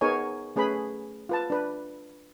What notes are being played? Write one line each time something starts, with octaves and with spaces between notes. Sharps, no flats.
B3 D#4 G#4 A#4 C#5 G#5
A3 C#4 G#4 B4 B5
F4 B4 A5
D4 B4